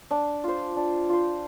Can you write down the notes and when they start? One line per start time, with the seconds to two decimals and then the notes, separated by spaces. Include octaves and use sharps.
0.11 D4
0.44 F4 C5
0.77 D4
1.09 F4 C5